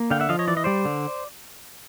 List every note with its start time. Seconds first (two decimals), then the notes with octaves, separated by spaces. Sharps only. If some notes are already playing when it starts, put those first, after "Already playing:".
Already playing: A#3
0.11 D3 F5 G5
0.20 E5 F#5
0.29 F3 D#5 F5
0.39 C#5 D#5
0.47 E3 D5
0.57 D#5
0.64 G3 C5 D5
0.85 D3